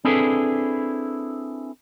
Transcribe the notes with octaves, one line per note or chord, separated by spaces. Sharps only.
C4 D4 E4 G#4 A4 B4